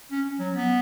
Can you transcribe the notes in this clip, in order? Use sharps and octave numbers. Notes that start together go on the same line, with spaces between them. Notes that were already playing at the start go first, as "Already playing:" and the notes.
C#4
F#3
B3